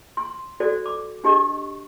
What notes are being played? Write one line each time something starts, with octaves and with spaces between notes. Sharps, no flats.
C6
F#4 A4 C5 D5
D6
D4 G4 D#5 C#6